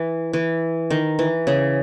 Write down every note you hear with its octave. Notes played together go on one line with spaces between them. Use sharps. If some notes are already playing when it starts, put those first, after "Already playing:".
Already playing: E3
E3
D#3
E3
C#3